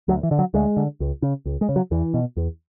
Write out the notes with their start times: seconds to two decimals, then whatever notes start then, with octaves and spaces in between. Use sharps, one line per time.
0.08 D2 F#3
0.23 E3
0.31 D3
0.39 F#3
0.54 D2 G#3
0.77 D3
1.00 C#2
1.22 C#3
1.46 C#2
1.61 G#3
1.69 C#3
1.76 F#3
1.91 E2 E3
2.14 B2
2.37 E2